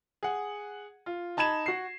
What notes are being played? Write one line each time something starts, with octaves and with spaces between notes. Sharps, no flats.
G#4 F#5
F4
D#4 A5 B5 G#6 E7
F#4 C7